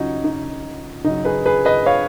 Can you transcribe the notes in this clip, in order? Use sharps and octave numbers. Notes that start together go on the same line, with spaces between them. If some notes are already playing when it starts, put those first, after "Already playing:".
Already playing: C#3 F#3 C#4 D#4 F4 F#4
D#4
C#3 F#3 D#4
G#4 B4
G#4 B4
B4 D#5
C#5 F5